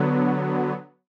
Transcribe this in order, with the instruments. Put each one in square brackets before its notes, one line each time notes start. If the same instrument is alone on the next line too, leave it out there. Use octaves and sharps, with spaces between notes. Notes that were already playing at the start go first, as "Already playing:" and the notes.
Already playing: [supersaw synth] D3 F#3 B3